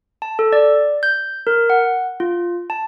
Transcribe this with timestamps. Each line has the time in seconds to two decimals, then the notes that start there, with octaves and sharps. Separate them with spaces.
0.22 A5
0.39 A4
0.53 D5
1.03 G6
1.47 A#4
1.70 F#5
2.20 F4
2.70 A5